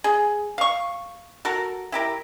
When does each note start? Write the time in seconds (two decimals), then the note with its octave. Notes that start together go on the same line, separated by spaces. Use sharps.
0.04 G#4
0.58 F5 C#6
1.45 F#4 A4 A#4
1.92 E4 G4 A#4